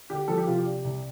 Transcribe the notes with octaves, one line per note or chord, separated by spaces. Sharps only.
D3 G4
F3 A4
G4
C3 F4
G4
D4
C2